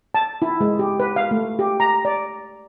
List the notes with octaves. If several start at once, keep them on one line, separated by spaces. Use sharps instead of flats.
A5
E4
G#3
G4
B4
F5
A3
G4
A#5
D5